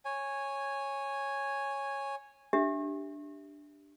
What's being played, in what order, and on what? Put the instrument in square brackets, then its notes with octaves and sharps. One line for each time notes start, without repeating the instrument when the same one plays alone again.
[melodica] C#5 G#5
[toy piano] D4 G4 E5